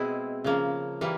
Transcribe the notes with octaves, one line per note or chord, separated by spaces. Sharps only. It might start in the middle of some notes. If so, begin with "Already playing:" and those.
Already playing: B2 G#3 C4 E4 G#4
C#3 F3 A#3
E3 G3 A#3